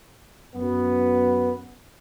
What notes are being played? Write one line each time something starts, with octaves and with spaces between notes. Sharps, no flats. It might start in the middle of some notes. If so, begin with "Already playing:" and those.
F#2 B3